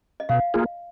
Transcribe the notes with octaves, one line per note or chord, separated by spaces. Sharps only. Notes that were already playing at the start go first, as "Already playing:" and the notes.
D#5
B2 F5
A#3 F4 G#4